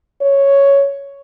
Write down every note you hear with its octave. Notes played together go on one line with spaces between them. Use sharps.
C#5